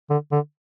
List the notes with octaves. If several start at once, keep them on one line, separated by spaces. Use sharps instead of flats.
D3
D3